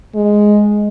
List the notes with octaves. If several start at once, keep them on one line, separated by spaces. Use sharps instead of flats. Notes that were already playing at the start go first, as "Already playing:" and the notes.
G#3